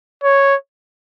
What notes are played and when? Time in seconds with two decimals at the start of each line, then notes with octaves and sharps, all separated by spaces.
0.24 C#5